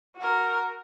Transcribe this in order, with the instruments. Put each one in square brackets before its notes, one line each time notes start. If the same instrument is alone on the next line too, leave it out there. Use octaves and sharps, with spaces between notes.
[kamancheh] F#4 A#4